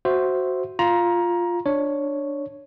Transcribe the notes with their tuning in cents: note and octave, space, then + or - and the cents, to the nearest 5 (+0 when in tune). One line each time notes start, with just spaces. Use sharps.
F#4 +0 C5 +0 E5 +0
F4 +0 A#5 +20
D4 +5 C#5 +0